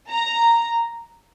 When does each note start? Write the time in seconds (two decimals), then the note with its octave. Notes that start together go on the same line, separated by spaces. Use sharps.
0.10 A#5